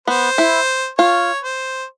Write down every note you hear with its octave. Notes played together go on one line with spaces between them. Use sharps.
B3 C5
E4
F4 C#5
C5